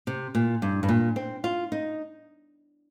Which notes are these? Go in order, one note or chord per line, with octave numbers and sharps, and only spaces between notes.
C3
A#2
G2
G2
A#2
C4
F4
D#4